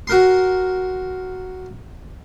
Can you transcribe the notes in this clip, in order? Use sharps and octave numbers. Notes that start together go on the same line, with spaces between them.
F#4 A#4 C6